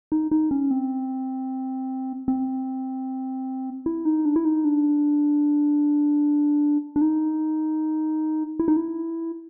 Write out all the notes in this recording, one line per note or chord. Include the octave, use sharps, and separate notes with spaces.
D#4
D#4
C#4
C4
C4
E4
D#4
D4
E4
D#4
D4
D4
D#4
E4
D#4
E4